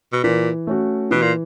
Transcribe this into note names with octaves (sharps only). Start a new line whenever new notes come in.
B2
A#2 E3
A3 C#4 F#4
B2 E3
A#2